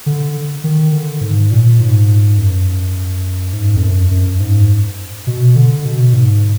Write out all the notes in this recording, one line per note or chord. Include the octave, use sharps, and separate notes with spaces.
D3
D#3
D3
G#2
A#2
G#2
F#2
G#2
F2
F#2
F#2
G#2
B2
D3
B2
G#2